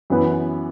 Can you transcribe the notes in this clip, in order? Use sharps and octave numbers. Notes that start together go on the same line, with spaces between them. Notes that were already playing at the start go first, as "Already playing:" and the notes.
F#2 E3 B3 E4 B4